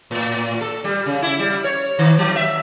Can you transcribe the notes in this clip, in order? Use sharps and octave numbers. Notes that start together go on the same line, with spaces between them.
A2
A4
G3
C#3
E4
G3
C#5
D#3
F#3
E5